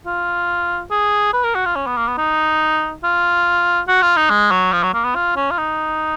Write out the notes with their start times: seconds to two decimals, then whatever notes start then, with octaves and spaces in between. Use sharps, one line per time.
0.06 F4
0.91 G#4
1.33 B4
1.44 A#4
1.55 F#4
1.65 F4
1.76 C#4
1.86 B3
1.97 A#3
2.08 B3
2.18 D#4
3.04 F4
3.88 F#4
4.02 F4
4.17 D#4
4.30 G#3
4.51 F#3
4.73 F3
4.83 F#3
4.94 A#3
5.04 B3
5.15 F4
5.36 C#4
5.51 F4
5.58 D#4